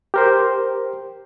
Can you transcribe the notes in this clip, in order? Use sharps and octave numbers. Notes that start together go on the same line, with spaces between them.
G4 A#4 C5